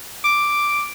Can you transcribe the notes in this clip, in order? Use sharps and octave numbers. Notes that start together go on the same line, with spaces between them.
D6